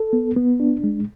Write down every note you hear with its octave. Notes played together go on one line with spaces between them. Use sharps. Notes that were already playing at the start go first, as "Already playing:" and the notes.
Already playing: A4
B3
B3
D4
G#3